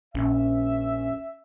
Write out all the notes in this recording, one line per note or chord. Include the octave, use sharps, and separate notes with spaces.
A#1 C#4 E5